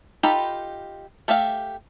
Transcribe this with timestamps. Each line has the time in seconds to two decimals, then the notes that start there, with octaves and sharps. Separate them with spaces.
0.23 D#4 F4 G4 A4 B5
1.28 A3 G4 E5 F5